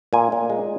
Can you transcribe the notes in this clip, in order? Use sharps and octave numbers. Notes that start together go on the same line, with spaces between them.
A#2 G#5
A#2
G#3